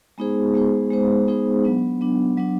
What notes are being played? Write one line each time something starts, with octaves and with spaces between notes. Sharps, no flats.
G#3 B3 D#4 G#4 C5
G#3 B3 D#4 G#4 C5
G#3 B3 D#4 G#4 C5
G#3 B3 D#4 G#4 C5
F#3 B3 D4
F#3 B3 D4
F#3 B3 D4